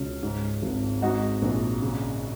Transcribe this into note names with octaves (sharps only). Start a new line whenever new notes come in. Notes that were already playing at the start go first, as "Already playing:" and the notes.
Already playing: C#2 B2 C#4
G#2
G#1
G#2 D#4 F#4
A#1
C#3